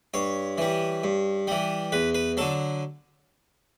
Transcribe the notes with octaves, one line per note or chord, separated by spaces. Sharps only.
G2 C#5
E3 G3
G2
E3 G3
E2 B4
B4
D3 F#3 A4